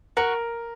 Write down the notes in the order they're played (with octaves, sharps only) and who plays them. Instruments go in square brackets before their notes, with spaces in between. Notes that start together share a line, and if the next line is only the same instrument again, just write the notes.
[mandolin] F#4 [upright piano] A#4